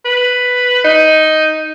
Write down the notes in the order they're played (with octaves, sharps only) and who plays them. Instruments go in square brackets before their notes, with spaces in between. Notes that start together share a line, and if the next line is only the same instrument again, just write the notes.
[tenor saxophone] B4
D#4